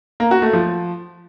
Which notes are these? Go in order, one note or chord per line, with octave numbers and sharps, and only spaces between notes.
A#3
F#4
A3
F3